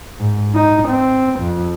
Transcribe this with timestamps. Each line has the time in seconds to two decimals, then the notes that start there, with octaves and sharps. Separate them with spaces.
0.20 G#2
0.55 D#4
0.89 C4
1.40 F2